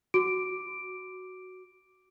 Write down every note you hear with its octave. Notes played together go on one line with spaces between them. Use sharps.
F#4 D6 D7